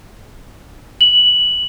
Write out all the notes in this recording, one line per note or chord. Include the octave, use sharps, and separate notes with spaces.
F#7